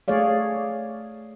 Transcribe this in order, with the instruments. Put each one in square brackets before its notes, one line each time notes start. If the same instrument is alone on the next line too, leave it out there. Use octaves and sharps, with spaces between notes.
[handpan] A3 G#4 C#5 D5 F5